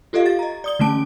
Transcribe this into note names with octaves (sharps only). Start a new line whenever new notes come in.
F4 G4 A4 D#5 F5
F5 A6
D#5 A#5
D5 D#6 G7
D3 E3 A3 C#4 A5 D7